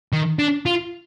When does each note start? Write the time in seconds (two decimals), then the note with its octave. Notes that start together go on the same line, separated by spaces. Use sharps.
0.13 D#3
0.39 D4
0.66 F4